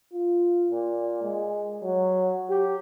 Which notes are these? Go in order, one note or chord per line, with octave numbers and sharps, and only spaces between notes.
F4
A#2
G#3
F#3
G4